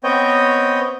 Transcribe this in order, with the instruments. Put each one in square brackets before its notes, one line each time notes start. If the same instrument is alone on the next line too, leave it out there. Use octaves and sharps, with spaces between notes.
[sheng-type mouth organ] B3 C4 C#5 D#5 G5